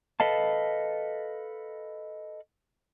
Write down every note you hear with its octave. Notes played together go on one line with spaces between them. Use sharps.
A4 B4 D#5 F5 A5